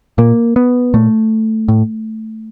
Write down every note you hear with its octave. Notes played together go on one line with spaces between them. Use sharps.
A#2 A#3
B3
A#2 A3
A2